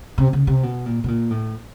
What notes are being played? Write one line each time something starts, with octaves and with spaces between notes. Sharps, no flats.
C3
C#3
C3
B2
A#2
B2
A#2
A2